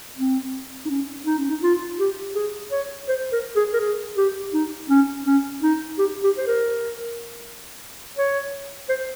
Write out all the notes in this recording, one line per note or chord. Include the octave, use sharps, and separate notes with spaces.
C4
D#4
C#4
D#4
C#4
D#4
F4
G4
G#4
C#5
C5
A#4
G#4
A#4
G#4
G4
D#4
C#4
C#4
D#4
G4
G4
C5
A#4
C#5
C5